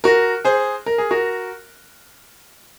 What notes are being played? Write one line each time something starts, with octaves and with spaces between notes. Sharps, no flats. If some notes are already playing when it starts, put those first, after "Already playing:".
F#4 A#4
G#4 C5
A#4
G#4
F#4 A#4